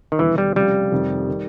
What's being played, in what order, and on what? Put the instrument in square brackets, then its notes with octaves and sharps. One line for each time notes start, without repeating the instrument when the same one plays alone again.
[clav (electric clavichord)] D#3
[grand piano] E1 D#2 D3 G3 B3 [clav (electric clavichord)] E3
[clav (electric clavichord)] G3
[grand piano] F1 F2 C#3 F3 [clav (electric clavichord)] G3
[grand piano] F1 F2 C3 D#3
D#3